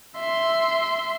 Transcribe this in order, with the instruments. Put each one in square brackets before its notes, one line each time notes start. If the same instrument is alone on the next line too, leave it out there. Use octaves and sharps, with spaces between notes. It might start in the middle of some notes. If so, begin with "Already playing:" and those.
[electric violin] E5 C6